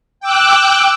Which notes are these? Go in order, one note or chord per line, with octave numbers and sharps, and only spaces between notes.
G5 D6 E6 F#6